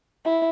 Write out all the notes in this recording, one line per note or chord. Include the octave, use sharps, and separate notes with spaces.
E4